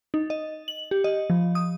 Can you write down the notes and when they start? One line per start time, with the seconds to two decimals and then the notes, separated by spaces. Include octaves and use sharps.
0.14 D#4
0.30 D#5
0.68 F#7
0.91 G4
1.04 D#5
1.30 F3
1.55 D#6